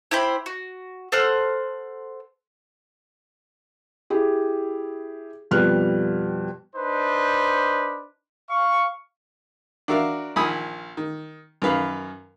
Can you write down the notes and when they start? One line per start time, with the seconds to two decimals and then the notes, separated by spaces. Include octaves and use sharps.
0.11 E4 G4 C5 B5
0.46 F#4
1.12 A4 C5 F#5 F6
4.10 E4 G4 G#4
5.51 F2 B2 G3 B4 F6 F#6
6.76 D4 D#4 B4 C5
8.50 F5 C#6
9.88 D4 F#4 A#4 E5 F5
10.36 A#1 D#3 G#5 B5 D#6 E6
10.97 D#3
11.62 F#2 D#3 B4 F5